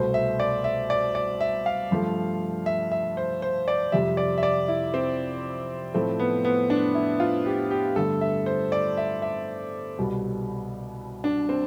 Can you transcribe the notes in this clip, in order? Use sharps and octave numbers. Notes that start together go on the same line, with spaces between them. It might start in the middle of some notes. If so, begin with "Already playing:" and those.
Already playing: C2 B2 A3 C5
E5
D5
E5
D5
D5
E5
F5
G2 F3 A3
E5
E5
C5
C5
D5
F2 C3 G3 E5
D5
E5
D5
E4
C4
A2 F3 A3 C4
B3
B3
D4
E4
F4
G4
G4
G2 D3 A3 A4
E5
C5
D5
E5
E5
C2 B2 G3
D4
C4